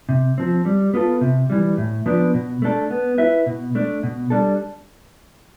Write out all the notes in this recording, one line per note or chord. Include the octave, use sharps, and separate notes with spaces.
C3
F3 C4
G3
B3 F4 A4
C3
E3 G3
A2
F3 B3 D4
B2
A3 D4 A4
B3
E4 B4 E5
B2
A3 D4
B2
G3 D4 A4